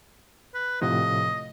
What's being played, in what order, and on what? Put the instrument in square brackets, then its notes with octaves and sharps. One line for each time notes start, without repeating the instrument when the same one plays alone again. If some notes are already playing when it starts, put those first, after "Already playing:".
[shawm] B4
[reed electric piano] A2 C3 F3 [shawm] D#5